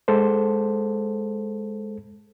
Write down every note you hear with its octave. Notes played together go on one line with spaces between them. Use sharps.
G#3 A4 C5